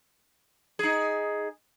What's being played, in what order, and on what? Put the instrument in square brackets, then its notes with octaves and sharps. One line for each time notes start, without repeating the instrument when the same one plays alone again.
[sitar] D#4 G#4